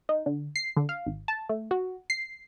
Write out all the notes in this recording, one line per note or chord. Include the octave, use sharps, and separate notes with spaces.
D#4
D3
C7
D3
F5
G#1
A5
A3
F#4
C7